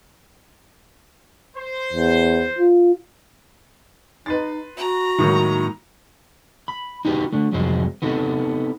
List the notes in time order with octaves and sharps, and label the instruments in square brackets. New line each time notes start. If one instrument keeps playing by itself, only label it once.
[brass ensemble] C5
[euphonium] E2
F4
[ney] D#4 [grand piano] B4 C6 A6
[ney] F#4 [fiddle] A#5
[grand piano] A2 D#3 F#3 [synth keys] G#3 A#3 D#4
[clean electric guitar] B5
D#4 F#4 G4 B4
A3 D4
C2 F2 F#3 G#3 C5
B3 C4 D#4 A4